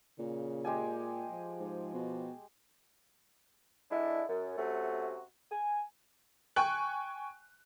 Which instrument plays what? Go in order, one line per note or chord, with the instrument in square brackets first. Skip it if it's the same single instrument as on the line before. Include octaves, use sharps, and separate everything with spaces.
[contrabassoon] A#2 [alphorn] C#3
[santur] G#3 G4 G#5
[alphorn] F3
[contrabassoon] G#2
B2
[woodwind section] D3 G#3 D4 E4
F#2
C3 A3 C#4 F#4
G#5
[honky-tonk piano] G5 G#5 C#6 F#6